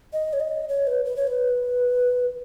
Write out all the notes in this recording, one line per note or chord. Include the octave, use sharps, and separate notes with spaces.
D#5
C#5
D#5
C#5
B4
B4
C#5
B4